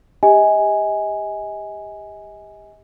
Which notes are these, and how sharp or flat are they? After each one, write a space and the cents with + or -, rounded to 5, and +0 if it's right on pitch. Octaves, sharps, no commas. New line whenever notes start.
G4 +25 D#5 +35 G#5 +0